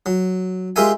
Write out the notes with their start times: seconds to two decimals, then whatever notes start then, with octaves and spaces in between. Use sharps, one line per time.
0.06 F#3
0.76 G#3 F4 G4 A#4 E5 G#5